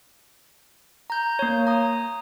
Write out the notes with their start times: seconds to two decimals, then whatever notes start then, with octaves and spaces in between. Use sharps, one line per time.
1.10 A#5 G6
1.39 A#3 C#5
1.67 A#5 D#6